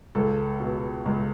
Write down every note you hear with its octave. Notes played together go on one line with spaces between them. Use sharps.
C#2 A4
B2
C#2